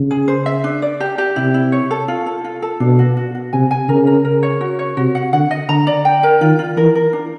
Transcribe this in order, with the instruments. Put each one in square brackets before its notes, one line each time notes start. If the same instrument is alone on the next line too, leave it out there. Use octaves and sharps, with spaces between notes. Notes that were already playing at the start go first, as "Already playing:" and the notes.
Already playing: [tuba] C#3
[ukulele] G#4
C5
E5
D4
D5
G4
G4
[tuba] C3 [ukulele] E4
[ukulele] E4
C#5
A4
F4
A4
F4
A4
[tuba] B2 [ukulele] D4
[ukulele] F#4
F#4
F#4
[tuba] C3 [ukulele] G#5
[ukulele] G#5
[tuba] C#3 [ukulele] A#4
[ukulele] A#4
A#4
C#5
F#4
C#5
[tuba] C3 [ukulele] F#4
[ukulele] F#5
[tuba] D3 [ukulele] F#5
[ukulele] D#5
[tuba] D3 [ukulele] A#5
[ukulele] D5
G5
A#4
[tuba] D#3 [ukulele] F4
[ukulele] F4
[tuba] E3 [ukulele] A#4
[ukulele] A#4
D4